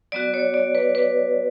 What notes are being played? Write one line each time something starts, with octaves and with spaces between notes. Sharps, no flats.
F#3 B3 F#4 D5
C#5
D5
B4
B4